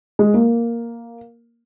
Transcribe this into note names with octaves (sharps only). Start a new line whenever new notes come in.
G#3
A#3